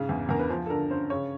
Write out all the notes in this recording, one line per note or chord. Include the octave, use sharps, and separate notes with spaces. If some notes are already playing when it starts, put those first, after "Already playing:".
Already playing: G#2 C#3
E2
E2 A#4
B4
F3 C5
A4
D3 A#4
C#4 C5
C#3 C#5